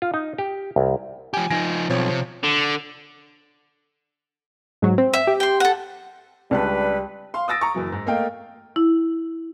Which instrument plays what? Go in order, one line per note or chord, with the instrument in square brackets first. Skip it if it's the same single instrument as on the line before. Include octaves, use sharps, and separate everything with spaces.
[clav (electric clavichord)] F4
D#4
G4
C2
[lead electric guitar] F3 G4 [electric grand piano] G#5
[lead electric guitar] F3 D#4 [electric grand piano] G#5 A#6 D7
[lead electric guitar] B1 [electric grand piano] F3 C4 C#5
[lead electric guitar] C3
[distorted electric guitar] D3
[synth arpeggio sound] G#2 F#3
C4
[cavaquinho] E5
[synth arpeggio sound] G4
[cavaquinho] G5 C6
A4 F#5
[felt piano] C#2 A5 F#6 [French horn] G3 [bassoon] D4 [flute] B4
[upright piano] F5 C6
D#6 E6 A6 A#6 D7
A#5 C#6
F#1 E3 F#3
G#2
A3 A#3 A#4 D#5 F5 G5
[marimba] E4